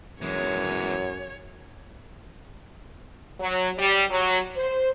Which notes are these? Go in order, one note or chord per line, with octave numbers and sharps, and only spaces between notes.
F#2 E3 G#3 C#5
F#3
G3
F#3
C5